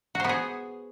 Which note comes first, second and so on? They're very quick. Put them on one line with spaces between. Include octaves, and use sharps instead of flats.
F#4 C5 B3 G#4